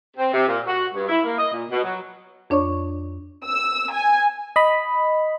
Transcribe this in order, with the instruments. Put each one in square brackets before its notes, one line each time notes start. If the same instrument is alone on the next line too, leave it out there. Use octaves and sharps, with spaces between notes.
[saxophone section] C4
C3
A#2
F#4
G2
E4
A#3
D#5
A#2
B2
F#3
[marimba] F2 D4 C#5 D5 C#6
[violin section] E6
G#5
[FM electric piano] D#5 B5